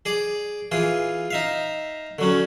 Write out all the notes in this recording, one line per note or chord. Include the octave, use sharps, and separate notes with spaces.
G#4 D5 D6
E3 F4 G#4
D#4 E5 F5
D3 F#3 C#4